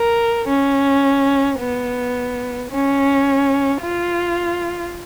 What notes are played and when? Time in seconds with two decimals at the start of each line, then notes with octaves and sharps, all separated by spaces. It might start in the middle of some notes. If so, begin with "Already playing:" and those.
Already playing: A#4
0.48 C#4
1.60 B3
2.71 C#4
3.82 F4